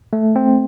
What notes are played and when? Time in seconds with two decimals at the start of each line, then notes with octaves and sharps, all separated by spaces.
0.13 A3
0.36 C4